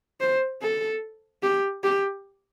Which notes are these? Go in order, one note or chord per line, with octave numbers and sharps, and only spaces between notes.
C5
A4
G4
G4